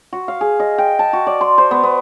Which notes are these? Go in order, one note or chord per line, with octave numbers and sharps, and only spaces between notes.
F#4
F5
G#4
D#5
G5
A5
F#4
D5
C6
C5
B3
B3